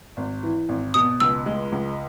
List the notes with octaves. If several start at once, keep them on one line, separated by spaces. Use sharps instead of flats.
G#1
E3
G#1
B2 D#6
C#2 E6
G#3
C#2